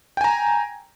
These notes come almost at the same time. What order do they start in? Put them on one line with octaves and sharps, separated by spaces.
G5 G#5 A#5